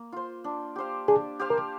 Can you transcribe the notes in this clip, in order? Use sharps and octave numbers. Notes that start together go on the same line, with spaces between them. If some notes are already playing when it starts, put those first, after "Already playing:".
Already playing: A#3
F4 C5
D4
G4 C5 F5
D4 G#4
G4 C5 F5
A#4